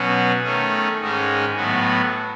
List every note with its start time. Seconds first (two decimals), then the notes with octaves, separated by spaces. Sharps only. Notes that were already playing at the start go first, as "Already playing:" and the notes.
Already playing: B2 F#3 C#4
0.43 D#3 A3 C#4
1.00 G#2 D#3 G#3 C#4
1.56 A2 F#3 B3